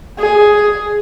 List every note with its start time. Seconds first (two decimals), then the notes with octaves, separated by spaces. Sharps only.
0.18 G#4